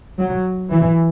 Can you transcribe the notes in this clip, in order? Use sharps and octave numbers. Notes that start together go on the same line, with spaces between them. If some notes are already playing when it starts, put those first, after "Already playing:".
F#3
E3